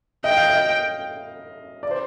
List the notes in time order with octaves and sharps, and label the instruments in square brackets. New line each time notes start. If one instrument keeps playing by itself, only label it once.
[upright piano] D#5 [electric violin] G5
[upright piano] F5
D#5
D5
C5